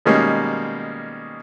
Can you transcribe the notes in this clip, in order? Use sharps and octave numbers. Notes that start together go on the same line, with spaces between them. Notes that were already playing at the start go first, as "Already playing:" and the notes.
B2 D#3 G3 G#3 A#3 C#4